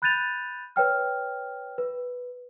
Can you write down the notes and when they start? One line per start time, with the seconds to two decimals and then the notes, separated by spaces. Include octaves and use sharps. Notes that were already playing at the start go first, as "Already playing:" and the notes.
0.02 B5 F#6 G6 A6 D#7 F7
0.76 B4 C#5 G5 F6
1.78 B4